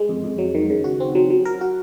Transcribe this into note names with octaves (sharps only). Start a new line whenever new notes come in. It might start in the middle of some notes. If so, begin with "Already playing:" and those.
Already playing: G#3
F2
F2
F#3
D#3
C#3
F#4
C4
F#3
F#3
A#4
F#4